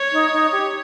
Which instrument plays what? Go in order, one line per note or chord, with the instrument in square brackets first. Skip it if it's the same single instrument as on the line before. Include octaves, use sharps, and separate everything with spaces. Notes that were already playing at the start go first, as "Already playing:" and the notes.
Already playing: [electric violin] C#5
[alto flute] D#4
D#4
G4